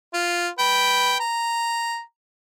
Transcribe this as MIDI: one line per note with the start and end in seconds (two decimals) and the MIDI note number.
0.14 0.48 65
0.59 1.18 71
0.59 1.18 79
1.20 2.00 82